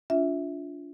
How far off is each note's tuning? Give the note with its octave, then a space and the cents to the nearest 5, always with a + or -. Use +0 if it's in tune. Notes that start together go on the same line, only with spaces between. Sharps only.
D4 -35 F4 +0 E5 -10